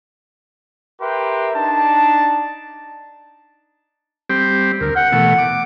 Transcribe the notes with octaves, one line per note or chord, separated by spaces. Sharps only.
G4 A#4 B4 E5 C6
D4 D#4 A5
G3 C4 G4
D2 A#4
F#5 G5
B2 E3 A3
D6